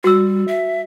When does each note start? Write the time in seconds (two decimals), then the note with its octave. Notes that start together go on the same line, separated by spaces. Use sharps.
0.04 G3 F#4 E6
0.48 E5